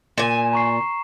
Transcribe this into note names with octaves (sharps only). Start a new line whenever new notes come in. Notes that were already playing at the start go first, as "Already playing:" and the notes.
A#2 G#5 E7
A#5 C#6 C7